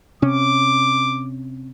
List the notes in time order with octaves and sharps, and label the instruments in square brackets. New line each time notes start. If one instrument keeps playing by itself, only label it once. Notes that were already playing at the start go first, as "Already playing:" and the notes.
[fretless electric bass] C3 C#4 [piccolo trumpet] D6